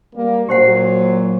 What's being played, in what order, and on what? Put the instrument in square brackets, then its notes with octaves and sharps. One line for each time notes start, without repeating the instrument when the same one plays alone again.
[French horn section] G3 A#3
[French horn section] A#2 F#3 [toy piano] G4 C5 F#5